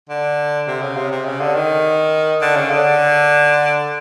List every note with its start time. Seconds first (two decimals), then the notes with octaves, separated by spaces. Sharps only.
0.09 D3
0.67 C3
0.82 C#3
0.96 C3
1.12 C3
1.25 C#3
1.40 D3
1.55 D#3
2.41 D3
2.56 C#3
2.70 D3